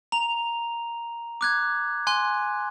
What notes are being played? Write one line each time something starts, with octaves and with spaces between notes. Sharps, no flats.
A#5 F7
D6 F#6 G#6
G#5 C6 F#6